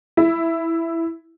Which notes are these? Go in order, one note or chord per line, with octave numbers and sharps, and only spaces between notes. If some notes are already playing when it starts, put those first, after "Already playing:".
E4